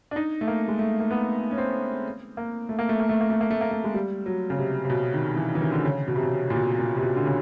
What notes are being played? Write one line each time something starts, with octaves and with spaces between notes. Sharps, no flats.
D4
D#4
A3
A#3
G#3
A3
A#3
B3
C#4
C4
A#3
A3
A#3
A3
A#3
A3
A#3
A3
A#3
A3
A#3
A3
G#3
G3
F#3
C#3
C3
C3
B2
D#3
E3
E3
D#3
D3
C#3
B2
C3
B2
A#2
B2
A#2
C3
B2
D3
C#3